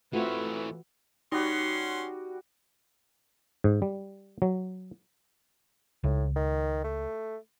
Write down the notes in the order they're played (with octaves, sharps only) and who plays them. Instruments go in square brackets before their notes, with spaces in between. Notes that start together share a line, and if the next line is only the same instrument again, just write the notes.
[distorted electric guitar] E3 C#5 [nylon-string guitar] A3 C4 [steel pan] F4 F#4 [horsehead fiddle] B4 E5
[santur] G3 F#4 [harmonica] C#4 C6 [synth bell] D#4
[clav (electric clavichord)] G#2
G3
F#3
[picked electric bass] C#2 [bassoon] A2
[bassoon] D#3
A3